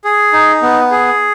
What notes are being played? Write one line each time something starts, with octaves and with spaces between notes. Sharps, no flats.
G#4
D#4
B3
G#4